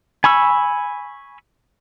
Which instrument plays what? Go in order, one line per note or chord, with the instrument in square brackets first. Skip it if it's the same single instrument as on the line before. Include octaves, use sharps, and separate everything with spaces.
[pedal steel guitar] G#5 B5 C#6 E6